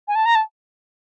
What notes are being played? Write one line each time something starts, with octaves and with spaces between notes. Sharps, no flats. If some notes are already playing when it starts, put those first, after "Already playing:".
G#5
A5
A#5
A5